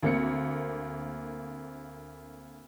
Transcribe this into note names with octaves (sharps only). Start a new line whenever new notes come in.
D2 A#3 C4 C#7